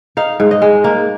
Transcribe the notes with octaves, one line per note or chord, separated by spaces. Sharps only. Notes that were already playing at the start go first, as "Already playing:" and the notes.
D#4 F5
G#2
D#5
G#3
A#3